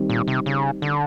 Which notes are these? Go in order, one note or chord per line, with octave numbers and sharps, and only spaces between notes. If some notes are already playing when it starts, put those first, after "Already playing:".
Already playing: D#3 G3 C4
A#2
C3
C#3
D3